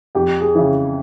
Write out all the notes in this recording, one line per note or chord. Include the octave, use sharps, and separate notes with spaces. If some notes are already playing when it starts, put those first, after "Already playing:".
F2 G4
G#4
C#3 E3